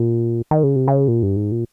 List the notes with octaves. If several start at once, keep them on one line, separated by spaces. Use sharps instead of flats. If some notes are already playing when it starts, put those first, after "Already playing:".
Already playing: A#2
D#3
C#3
C3
C#3
A#2
G2
G#2
A#2